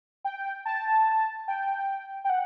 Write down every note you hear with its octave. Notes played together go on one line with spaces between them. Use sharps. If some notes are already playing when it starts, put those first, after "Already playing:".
G5
A5
G5
G5
F#5